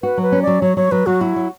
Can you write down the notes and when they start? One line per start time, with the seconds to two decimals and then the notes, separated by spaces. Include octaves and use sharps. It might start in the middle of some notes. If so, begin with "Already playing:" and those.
0.03 F#4 B4
0.18 F#3 B4
0.32 C#4
0.42 D5
0.47 F#3
0.62 F#3 C#5
0.77 F#3 C#5
0.91 F#3 B4
1.06 F#3 F#4
1.21 E4 F#4
1.36 F#3